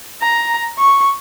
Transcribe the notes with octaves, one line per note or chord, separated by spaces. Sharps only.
A#5
C#6